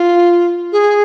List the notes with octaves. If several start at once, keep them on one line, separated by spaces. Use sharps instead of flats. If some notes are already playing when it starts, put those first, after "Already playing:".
Already playing: F4
G#4